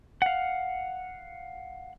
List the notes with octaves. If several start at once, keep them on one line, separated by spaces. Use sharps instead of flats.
F5 F#5